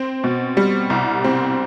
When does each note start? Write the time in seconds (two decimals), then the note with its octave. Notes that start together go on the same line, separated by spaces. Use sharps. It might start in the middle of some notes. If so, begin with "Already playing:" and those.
Already playing: C4
0.24 B2
0.57 G3
0.90 C2
1.24 C4